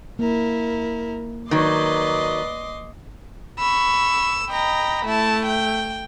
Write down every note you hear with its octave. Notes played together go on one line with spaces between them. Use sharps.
A#3 E4 A#4
D#3 F#3 B4 D5 D#5 C6 D6
B5 C#6 E6
D#5 G5 A#5 B5
A3 E4 A5
G5